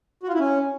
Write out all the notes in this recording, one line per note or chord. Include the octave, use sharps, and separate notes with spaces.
F#4
F4
E4
C#4